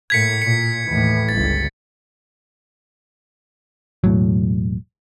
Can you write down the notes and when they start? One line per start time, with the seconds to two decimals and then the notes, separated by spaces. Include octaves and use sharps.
0.10 A2 A#3 G#6 B6 C#7
0.42 A#2 C#7
0.84 D#2 A2 E3
1.29 G1 C#2 A6
4.04 E1 A2 F#3